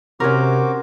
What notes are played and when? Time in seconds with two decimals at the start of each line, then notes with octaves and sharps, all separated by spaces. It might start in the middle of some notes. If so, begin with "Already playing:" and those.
0.20 C3 C#4 F#4 A#4 C5 D6